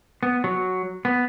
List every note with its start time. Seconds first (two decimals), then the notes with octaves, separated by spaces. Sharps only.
0.23 B3
0.44 F#3
1.05 B3